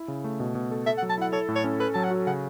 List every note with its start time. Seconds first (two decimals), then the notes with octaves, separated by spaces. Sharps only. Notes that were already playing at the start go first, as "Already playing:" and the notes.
Already playing: E4
0.08 C#3
0.24 A3
0.40 B2
0.55 B2
0.71 A4
0.86 A4 E5
0.97 F#5
1.02 F#3
1.10 A5
1.18 E4 F#5
1.33 A4 C#5
1.49 A2
1.56 C#5
1.64 C#4
1.80 A4 B4
1.94 F#3 A5
2.04 F#5
2.11 F#4
2.27 C#3 F#5